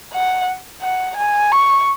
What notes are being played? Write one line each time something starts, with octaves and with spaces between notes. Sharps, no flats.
F#5
F#5
G#5
C#6